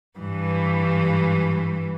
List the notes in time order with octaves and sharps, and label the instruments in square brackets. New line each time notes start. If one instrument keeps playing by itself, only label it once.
[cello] G2 E3